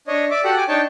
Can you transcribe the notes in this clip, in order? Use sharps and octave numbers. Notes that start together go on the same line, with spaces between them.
D4 C#5 D#5
D5 E5 D6
F#4 G4 A4 F#5
G4 G#5 D6
D4 D#4 C#5 G5 A5